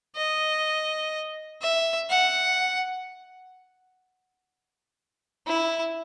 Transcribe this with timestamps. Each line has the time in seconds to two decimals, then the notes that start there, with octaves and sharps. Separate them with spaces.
0.16 D#5
1.62 E5
2.10 F#5
5.47 E4